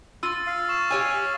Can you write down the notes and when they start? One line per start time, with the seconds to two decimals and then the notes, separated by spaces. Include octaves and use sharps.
0.23 F4 E6 A6
0.47 F5
0.69 C#6 E7
0.90 G4 C#5 G#5